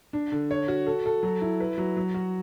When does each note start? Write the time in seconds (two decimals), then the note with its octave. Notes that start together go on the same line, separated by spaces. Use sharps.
0.13 D4
0.32 D3
0.51 C#5
0.68 F#4
0.87 A4
1.06 A4
1.23 F#3
1.42 E4
1.60 B4
1.78 F#3
1.97 F#3
2.14 F#4